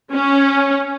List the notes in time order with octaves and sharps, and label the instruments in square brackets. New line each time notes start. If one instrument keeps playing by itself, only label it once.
[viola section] C#4